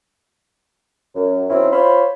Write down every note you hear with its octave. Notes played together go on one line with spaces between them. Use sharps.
F#2
D#3 F#3 C4 C#4 E4
F4 C5 C#5 B5